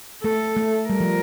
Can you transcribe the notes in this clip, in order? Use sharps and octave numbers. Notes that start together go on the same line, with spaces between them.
A3 A4
A3
G3 A#4
F3